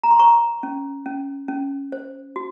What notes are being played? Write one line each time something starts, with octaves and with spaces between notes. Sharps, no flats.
A#5
C6
C5 A#5 C#6
C#4
C#4
C#4
C5
F#4